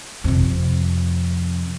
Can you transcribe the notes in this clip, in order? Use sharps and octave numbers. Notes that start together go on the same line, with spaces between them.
F2 C3